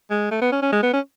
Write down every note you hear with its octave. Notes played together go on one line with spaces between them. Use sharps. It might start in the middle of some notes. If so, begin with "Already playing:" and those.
G#3
A3
B3
C#4
C#4
G#3
B3
C#4